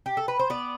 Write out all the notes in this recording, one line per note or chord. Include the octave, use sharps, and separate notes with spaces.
G4
A4
B4
C5
B3 D5